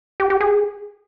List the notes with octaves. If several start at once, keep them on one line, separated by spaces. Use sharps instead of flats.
G4
G4
G#4